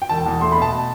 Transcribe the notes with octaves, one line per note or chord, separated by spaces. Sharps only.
G5
E1 A5
E2
A3 C6
B5
B2 A5